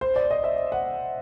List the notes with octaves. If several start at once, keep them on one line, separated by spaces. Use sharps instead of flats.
C5
D5
D#5
E5
F#5